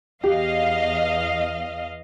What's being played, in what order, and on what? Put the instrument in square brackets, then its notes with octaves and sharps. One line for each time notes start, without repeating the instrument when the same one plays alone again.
[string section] E2 D#5 F5 [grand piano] G4